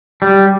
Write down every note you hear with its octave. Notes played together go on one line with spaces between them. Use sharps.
G3